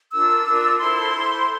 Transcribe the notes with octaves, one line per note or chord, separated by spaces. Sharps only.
D4 F4 A#4 E6
D4 F4 A#4
E4 A4 C5 C6
E4 A4 C5